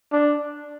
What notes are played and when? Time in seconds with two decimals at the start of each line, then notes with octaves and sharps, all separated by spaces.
0.12 D4